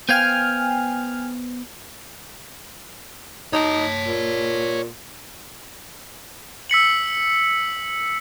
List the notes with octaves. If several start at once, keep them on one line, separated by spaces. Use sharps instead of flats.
B3 C5 F5 G5 G#5 F6
D#4 C#5 A5
A#2
E6 B6 C#7 F#7